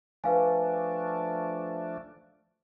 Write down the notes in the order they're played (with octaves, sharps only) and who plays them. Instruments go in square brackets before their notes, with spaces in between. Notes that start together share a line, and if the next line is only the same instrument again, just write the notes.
[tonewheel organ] F3 A3 D4 [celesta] B4 F5 G#5